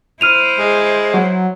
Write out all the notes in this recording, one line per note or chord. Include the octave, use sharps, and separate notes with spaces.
E4 C5 F6 D#7 F7
G#3
F#3